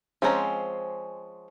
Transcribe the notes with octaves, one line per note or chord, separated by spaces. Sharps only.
F3 G#3 C4 C#4 A#5